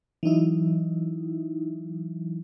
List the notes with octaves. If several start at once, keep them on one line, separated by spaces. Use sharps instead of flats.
E3 F#3 D#4 E4